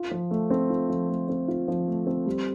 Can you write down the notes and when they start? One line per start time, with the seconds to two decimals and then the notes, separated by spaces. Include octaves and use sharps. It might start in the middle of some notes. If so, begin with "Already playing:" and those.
Already playing: F4
0.11 F3
0.31 A3
0.51 C4
0.70 F4
0.90 F3
1.09 A3
1.29 C4
1.48 F4
1.68 F3
1.87 A3
2.07 C4
2.26 G3